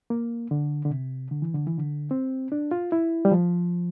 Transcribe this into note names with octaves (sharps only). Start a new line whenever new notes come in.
A#3
D3
D3
C3
D3
E3
D3
E3
D3
C4
D4
F4
E4
G3
F3